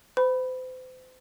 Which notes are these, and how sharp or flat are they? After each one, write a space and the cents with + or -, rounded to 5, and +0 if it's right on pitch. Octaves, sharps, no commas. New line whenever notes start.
C5 -40 B5 +0